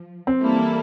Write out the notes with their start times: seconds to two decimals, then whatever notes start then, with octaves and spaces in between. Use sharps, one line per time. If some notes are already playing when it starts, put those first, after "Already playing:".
Already playing: F3
0.27 C4
0.40 E3 G3 A#3 E4 A4